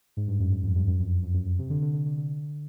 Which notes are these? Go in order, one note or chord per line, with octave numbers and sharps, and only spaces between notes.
G#2
G2
F#2
F#2
F2
G2
F#2
F2
F2
F#2
F#2
C3
D3
D3
D3
D3
D3